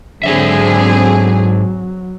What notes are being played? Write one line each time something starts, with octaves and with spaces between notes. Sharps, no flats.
G#2 D3 F#3 C4 G#4 C#5 E5